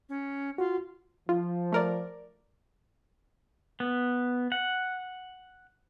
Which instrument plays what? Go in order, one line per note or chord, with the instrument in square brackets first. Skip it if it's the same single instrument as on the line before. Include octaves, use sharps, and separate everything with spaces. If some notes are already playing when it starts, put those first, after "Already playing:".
[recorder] C#4
[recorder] F4 [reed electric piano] F#4
[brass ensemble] F3 [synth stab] F4
[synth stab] A3 A#4 D5
[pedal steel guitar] B3
F#5